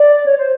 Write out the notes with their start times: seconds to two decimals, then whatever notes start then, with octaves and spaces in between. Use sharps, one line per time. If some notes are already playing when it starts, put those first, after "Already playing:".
Already playing: D5
0.25 C#5
0.37 C5